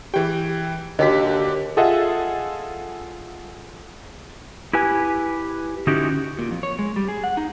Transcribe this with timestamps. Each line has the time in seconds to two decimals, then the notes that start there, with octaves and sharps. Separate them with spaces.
0.14 E3 G4 G#4 G5
0.99 D#2 D3 F#4 G4 D#5 B6
1.77 F4 G#4 A4 D#5 E5 F#5
4.73 E4 G4 B4 G#5
5.87 D3 C#4 D#4 E4 F#4 G4
6.39 A#2
6.51 F2
6.63 C#5
6.79 G#3
6.96 G3
7.08 G#4
7.24 F#5
7.37 D#4